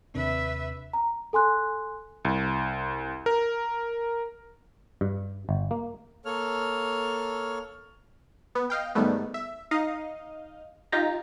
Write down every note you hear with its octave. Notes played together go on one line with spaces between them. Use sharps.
D#2 C3 D4 B4 E5
A#5
A4 G#5 C6 F#6
C2
A#4
G2
G1
A#3
A#3 A4 C#5 F6
B3
D#5 F5 G5
G#2 D#3 G3 A3 B3
E5
D#4 D#5 F5
D#4 F4 G4 A#5